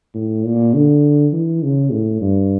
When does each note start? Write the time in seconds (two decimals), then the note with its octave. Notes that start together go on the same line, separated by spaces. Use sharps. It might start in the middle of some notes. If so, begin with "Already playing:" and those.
0.14 A2
0.44 A#2
0.74 D3
1.33 E3
1.63 C#3
1.92 A2
2.21 G2